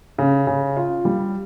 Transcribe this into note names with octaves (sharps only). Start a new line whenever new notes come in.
C#3
C#3
F4
G3